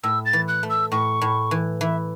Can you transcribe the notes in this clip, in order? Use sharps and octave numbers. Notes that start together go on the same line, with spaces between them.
A2 E6
A6
E3
F#6
A3
E6
A2 C#6
A2
E3
E3 E5